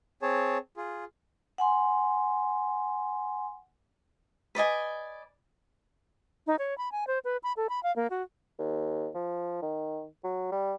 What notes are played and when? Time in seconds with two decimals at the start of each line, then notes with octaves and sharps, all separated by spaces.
0.22 C4 G#4 C#5 A5
0.77 F4 G#4
1.58 F#5 G#5 C6
4.55 B4 D5 D#5 G#5
6.47 D#4
6.59 C#5
6.78 B5
6.92 G#5
7.07 C5
7.25 B4
7.43 B5
7.57 A4
7.69 B5
7.83 F5
7.96 A#3
8.10 F#4
8.59 D#2
9.15 F3
9.62 D#3
10.24 F#3
10.52 G3